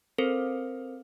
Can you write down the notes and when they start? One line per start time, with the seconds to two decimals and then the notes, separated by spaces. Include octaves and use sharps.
0.18 C4 A4 A#4 C5